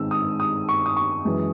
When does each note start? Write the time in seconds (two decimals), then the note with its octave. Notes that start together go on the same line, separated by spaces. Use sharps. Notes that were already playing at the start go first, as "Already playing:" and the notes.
Already playing: G#2 D#3 G#3 C4 E6
0.11 D#6
0.40 D#6
0.69 C#6
0.86 D#6
0.97 C#6
1.25 F#2 E3 G#3